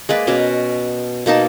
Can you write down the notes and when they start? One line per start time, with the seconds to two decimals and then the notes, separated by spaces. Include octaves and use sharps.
0.09 G#3 A#3 B4 D5
0.27 B2 C#4 A#4 B4
1.26 B2 A#3 D#4 A5